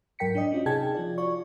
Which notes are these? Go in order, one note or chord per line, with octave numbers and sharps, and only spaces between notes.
G#2 F#3 A#4 G5 B6 C#7
D4 D5 D#5
C#4 F4 F#4
C3 D#4 G#4 G5 A5 G#6
F3 F4 D5
F4 F#4 D5 C#6